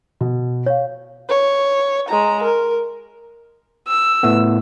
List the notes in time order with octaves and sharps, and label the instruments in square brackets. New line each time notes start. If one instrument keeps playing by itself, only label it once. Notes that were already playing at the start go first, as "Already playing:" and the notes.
[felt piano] B2
[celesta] C#5 F5
[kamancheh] C#5
G#3 A#5
A#4
E6
[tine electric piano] A2 A3 B3